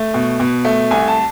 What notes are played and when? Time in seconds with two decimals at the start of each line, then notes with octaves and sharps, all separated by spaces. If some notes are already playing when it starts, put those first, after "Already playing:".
Already playing: A3
0.14 B2
0.40 B2
0.65 A3
0.91 C2 G#5
1.08 A5